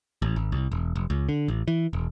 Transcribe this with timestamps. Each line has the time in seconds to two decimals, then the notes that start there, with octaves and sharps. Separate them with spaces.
0.22 A1
0.36 G#1
0.52 C2
0.72 E1
0.96 F1
1.10 C#2
1.29 D3
1.48 A1
1.68 E3
1.93 E1